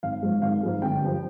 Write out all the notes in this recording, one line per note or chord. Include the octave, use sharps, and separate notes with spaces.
G#1 F5
G#2 F3 G#3
G#1 F5
G#2 F3 G#3
G1 G5
G2 F3